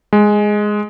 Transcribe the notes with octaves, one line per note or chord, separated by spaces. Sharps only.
G#3